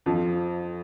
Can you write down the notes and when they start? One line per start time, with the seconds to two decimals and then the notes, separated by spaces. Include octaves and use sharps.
0.06 F2 F3